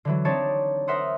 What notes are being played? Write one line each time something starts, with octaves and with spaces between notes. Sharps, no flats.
D3 E3 F#3
C4 D4 D#4 C#5 D5 A5
A#4 C5 E5 F#5 C6 D#6